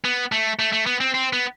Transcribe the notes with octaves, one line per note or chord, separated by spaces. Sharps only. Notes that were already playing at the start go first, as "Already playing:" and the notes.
B3
A3
A3
A3
B3
C4
C4
B3